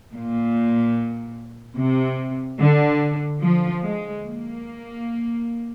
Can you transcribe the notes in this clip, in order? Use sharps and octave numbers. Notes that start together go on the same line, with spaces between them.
A#2
C3
D3
F3
G#3
A#3